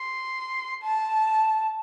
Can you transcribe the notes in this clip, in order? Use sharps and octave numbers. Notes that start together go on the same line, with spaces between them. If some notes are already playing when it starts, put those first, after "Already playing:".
Already playing: C6
A5